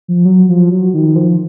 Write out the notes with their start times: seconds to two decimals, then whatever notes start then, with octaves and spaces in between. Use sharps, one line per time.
0.08 F3
0.25 F#3
0.49 F3
0.71 F#3
0.94 D#3
1.16 F3